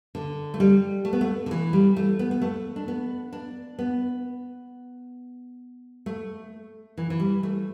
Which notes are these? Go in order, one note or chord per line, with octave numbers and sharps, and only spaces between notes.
D3
A3
G3
A3
B3
A3
D3
E3
G3
A3
B3
B3
A3
D4
B3
D4
B3
A3
E3
E3
G3
A3